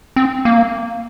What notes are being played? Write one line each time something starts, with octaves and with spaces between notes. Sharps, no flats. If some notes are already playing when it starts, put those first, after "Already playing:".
C4
A#3